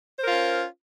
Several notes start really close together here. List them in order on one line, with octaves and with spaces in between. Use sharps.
C5 A#4 F4 C#4